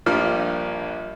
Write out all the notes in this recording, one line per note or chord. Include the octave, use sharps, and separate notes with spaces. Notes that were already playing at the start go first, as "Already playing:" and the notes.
A#1 G2 F3 G3 A#3 F6